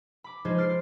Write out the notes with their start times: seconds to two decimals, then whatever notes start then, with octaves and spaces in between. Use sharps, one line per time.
0.24 B5 D6
0.45 F3 G#3 D#4 F4 G#4 C5
0.58 C6 F6 A6 C7 D7